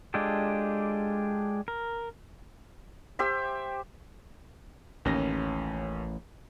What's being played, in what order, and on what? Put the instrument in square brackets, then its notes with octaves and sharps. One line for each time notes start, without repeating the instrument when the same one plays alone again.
[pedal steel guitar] G#3 D4 F4 G4 A4
A#4
[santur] G4 C5 E5
[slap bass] A1 [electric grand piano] D#2 C#4 A#6